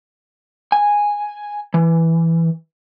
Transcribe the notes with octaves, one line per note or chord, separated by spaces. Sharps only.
G#5
E3